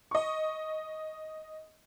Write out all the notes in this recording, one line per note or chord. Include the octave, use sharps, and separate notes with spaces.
D#5 C#6